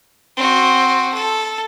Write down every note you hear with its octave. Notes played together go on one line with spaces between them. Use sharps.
C4 F#4
A4